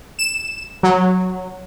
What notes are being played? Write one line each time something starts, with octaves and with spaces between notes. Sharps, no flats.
E7
F#3